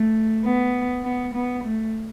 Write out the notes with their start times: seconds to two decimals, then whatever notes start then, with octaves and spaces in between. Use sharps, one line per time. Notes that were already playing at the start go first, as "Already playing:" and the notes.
Already playing: A3
0.45 B3
1.04 B3
1.35 B3
1.64 A3